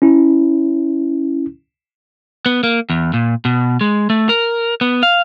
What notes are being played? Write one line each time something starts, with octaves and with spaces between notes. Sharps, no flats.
C#4 E4
B3
A#3
E2
A#2
B2
G#3
A3
A#4
B3
F5